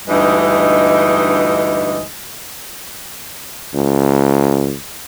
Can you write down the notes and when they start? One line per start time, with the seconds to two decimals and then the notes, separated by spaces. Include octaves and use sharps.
0.08 D2 G2 E3 G#3 D#4 D#5
3.75 C#2